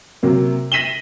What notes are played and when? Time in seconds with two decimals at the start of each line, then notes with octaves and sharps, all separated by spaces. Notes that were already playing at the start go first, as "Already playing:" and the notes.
0.23 C3 F#3 A#3
0.72 A#6 B6 D#7 E7 F#7 G7